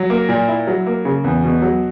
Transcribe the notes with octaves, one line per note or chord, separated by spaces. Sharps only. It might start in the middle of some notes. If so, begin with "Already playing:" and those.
Already playing: F#3
A#3
A#2
E4
F#3
A#3
C#3
E2
B2
F#3